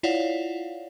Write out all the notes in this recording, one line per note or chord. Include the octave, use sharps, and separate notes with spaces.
E4 F4 C#5 D5 F5 F#5